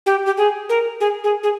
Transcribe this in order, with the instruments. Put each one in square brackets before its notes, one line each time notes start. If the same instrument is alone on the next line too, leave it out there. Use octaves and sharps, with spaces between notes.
[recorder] G4
G4
G#4
A#4
G#4
G#4
G#4